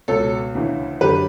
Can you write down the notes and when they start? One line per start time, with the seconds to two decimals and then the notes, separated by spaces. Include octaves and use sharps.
0.08 C#2 B2 A4 C#5
0.55 D2 C#3 E3
1.01 F#2 D3 G4 B4